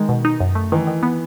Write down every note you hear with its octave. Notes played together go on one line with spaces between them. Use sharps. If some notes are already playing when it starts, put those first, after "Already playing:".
Already playing: D#3 G#3
B2
D#4
F#2
A3
D#3 E3
D#3
B3